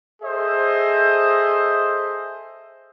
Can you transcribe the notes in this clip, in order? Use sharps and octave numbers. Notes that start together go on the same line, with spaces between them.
G#4 A4 C5 D#5 E5